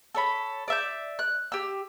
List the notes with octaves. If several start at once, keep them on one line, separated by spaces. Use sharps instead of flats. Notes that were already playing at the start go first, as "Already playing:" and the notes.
A4 C#5 B5
D5 E5 G6
F#6
G4 E6